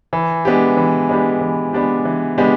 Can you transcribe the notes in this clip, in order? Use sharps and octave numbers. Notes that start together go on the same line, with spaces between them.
E3
G#3 B3 D4 G4
E3
G#3 B3 D4 G4
E3
G#3 B3 D4 G4
E3
G#3 B3 D4 G4